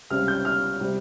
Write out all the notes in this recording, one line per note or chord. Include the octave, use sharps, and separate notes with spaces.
C#2 C3 G3 F6
G6
F6
C3 G3